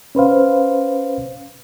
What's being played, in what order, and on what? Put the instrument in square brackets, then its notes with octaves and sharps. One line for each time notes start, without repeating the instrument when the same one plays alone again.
[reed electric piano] C#4 B4 C5 F5